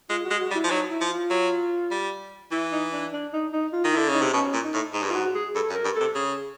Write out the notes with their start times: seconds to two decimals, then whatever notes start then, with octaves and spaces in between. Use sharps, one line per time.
0.10 G#3 F4
0.25 F#4
0.31 G#3
0.41 F#4
0.51 G3
0.55 E4
0.64 F3
0.70 F#3 D#4
0.90 E4
1.01 F3
1.11 F4
1.30 F#3
1.91 G3
2.51 E3 E4
2.72 D#4
2.93 D4
3.13 D4
3.33 D#4
3.53 D#4
3.73 F4
3.84 D#3
3.93 D3 E4
4.09 C#3 D#4
4.22 C3
4.33 B2 C#4
4.54 A#2
4.64 D#4
4.74 A2
4.94 G#2
5.03 G2
5.10 G#2 F4 F#4
5.35 G#4
5.55 G2 A4
5.70 F#2
5.75 A#4
5.85 G2
5.95 C3 A4
6.15 C#3 G#4